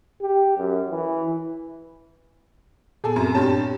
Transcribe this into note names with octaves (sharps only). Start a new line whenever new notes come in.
G4
F#2
E3
A#2 B3 G#4 A4
F#2 C4
G2 G4 C#5 A5